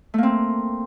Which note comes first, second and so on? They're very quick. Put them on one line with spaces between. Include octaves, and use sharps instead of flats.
A3 A#3 C4